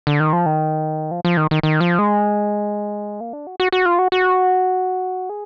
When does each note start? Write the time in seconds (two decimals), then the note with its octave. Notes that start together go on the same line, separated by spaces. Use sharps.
0.07 D3
0.20 D#3
0.33 F3
0.46 D#3
1.11 F3
1.25 F3
1.37 D#3
1.51 D#3
1.63 D#3
1.81 F3
1.99 G#3
3.20 A#3
3.33 D4
3.47 F#4
3.60 F#4
3.72 F#4
3.86 F4
3.99 F#4
4.12 F#4
5.29 G#4